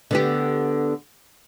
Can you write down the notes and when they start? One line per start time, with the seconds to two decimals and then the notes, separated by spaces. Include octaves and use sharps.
0.11 D3 B3 G4